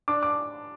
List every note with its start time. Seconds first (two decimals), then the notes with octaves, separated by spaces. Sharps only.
0.08 D4 D6
0.23 D6